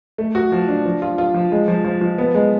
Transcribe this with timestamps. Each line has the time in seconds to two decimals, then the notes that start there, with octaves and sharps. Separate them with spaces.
0.18 A3
0.35 F#4
0.52 F3
0.68 D4
0.85 F3
1.02 F4
1.18 F4
1.34 F3
1.52 G#3
1.68 F3
1.85 F3
2.01 F3
2.18 B3
2.35 G#3